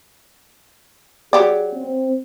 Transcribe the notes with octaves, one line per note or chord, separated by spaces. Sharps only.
F#3 G4 G#4 D5
C4